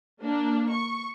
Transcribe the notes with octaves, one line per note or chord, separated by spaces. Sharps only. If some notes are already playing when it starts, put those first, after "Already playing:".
A#3 D4
C#6